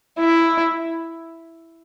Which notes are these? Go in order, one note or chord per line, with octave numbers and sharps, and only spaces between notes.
E4